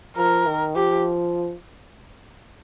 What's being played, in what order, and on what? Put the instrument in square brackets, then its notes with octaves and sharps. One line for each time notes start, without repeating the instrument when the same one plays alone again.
[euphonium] F3 [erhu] A#4
[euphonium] D#3
[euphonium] F3 [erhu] G4